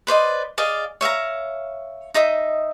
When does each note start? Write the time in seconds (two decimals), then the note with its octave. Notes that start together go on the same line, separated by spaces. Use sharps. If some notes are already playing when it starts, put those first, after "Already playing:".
0.07 B4 C5 D5 D#5
0.58 G#4 D5 D#5 F5
1.01 C#5 E5 F5 A#5
2.14 D#4 D#5 E5 D#6